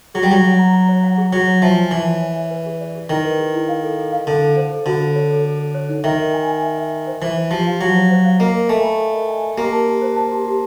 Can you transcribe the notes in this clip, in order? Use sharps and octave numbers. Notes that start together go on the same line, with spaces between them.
F#3 G#4
G3
F#3 G#4
F#5
A#5
A#5
C#5
F#5
G#4
F#3 C#5
C#5
F3 E5
G#5
E3 C#5
G#5
C#5
E5
B4
G#4
D5
G#4
D#3 E4
B4
G#4
E4
F5
A4
A4
F5
D3 A4
A4
C5
A4
D3 F#4
F#4
C#5
A4
A4
A4
C#5
D#4
D#3 E5
E5
G#5
G#5
E5
E5
E5
C5
E3 C5
C5
F3 G4
F5
F#3 F5
C5
C5
F5
A#3 D#5
D#5
A3 G#5
B5
A#4
D#5
G#5
D#5
A#3 G4
A5
G4
C5
A5
G4
G4